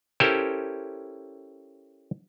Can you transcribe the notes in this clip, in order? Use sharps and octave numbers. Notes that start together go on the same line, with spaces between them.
C#4 E4 G4 A4 A#4 C5